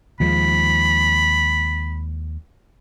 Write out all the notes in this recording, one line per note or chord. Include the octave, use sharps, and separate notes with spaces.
D#2 F3 G#3 B5